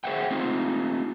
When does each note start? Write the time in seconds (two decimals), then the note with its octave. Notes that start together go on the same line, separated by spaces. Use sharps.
0.04 G#4 C5 D5 E5 F#5 G5
0.31 C4 D#4 F4